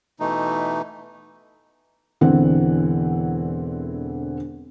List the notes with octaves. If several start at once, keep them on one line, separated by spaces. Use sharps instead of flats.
B2 E3 A3 D#4
E1 D3 E3 C4 F#5